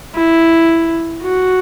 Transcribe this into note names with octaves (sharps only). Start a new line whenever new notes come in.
E4
F#4